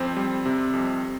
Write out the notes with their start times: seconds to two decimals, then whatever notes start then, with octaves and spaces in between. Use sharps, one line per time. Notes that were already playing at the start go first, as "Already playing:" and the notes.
Already playing: F2 C4
0.17 G3
0.46 C3
0.74 F2